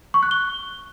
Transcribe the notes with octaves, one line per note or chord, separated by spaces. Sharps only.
C#6
F#6
G7